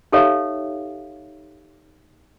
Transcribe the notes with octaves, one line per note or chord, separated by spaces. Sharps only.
D#4 G4 A4 C#5 E5 F5